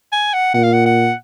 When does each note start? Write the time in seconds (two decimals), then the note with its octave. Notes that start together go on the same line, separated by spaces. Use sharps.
0.13 G#5
0.33 F#5
0.54 A#2 F#5
0.63 F5
0.73 F#5
0.86 F#5